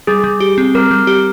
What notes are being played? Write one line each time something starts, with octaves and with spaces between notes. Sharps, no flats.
G3 G#4
G3
G4
C4
G3 A#4
G3
G4